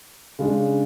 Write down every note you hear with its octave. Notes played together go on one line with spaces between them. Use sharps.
C#3 G#3 D4